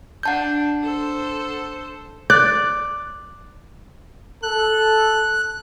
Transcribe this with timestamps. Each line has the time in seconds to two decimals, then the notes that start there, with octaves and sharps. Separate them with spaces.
0.23 D4 F#5 A5 G6
0.83 A4 C5
2.30 D5 F#6
4.43 A4 F#6